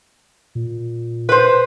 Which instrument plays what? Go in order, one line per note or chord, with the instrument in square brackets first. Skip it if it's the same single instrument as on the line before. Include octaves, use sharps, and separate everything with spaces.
[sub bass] A#2
[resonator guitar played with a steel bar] B4 C5